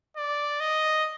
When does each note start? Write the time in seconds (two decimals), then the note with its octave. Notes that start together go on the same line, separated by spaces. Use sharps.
0.17 D5
0.60 D#5